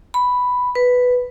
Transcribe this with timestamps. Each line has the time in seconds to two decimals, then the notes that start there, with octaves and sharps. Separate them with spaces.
0.14 B5
0.75 B4